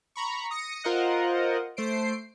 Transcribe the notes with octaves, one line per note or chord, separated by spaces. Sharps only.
A#5 B5 C#6
D#6 A#6 C#7
F4 A#4 C5 D#5 F#5
A3 C5 C7 D7